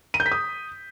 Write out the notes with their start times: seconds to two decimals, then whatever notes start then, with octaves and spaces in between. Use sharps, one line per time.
0.14 D#7
0.20 G6
0.26 B6
0.32 D#6